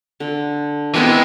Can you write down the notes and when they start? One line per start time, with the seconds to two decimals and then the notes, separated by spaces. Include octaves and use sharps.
0.20 D3
0.94 E3 G#3 B3 C4 E4